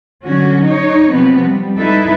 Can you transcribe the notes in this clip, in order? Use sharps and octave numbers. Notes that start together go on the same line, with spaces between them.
D3 F#3 C#4 F#4
D#4 C#5
C3 F3 F#3 B3 C4
G3
G3 D#4 E4 A4 B4 E5